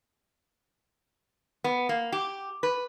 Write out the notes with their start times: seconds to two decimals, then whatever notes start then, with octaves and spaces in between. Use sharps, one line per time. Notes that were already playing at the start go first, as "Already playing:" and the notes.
1.64 B3
1.89 A#3
2.12 G4
2.63 B4